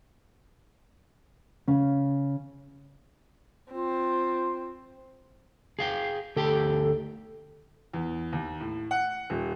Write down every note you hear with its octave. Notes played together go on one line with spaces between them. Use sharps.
C#3 C#4
C4 F4
G#4 F5 G5
D2 G4 A4 G5
E2
D#2
A2
F#5
D#1